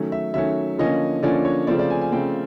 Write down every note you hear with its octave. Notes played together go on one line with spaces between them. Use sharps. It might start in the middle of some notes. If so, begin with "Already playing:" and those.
Already playing: D#3 F#3 A3 C#4
E5
D#3 F#3 A3 C#4 E5
D3 F3 A#3 C#4 D#5
D3 F3 A#3 C#4 D5
C#5
C#3 F3 A3 C4 D5
D5
G#5
G#5
C#3 F3 A3 C4 G5